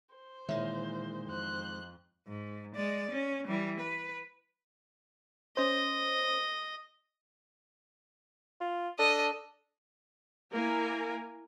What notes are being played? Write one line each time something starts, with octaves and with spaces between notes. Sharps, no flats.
C5
A#2 D#3 E3 G#3 E4 C#5 E5
F2 C5 F#6
G#2
G#3 D5
C#4
E3 G3
B4
C#4 C5 D#5
F4
D4 A4 D#5
A#3 E4 A#4 G#5